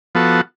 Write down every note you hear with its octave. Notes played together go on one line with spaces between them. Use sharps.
F3 B3 F#4 A4